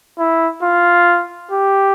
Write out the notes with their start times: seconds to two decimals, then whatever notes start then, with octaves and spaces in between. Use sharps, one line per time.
0.19 E4
0.62 F4
1.52 G4